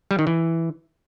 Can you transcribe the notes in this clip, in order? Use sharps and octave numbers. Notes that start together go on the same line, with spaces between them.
G3
D#3
E3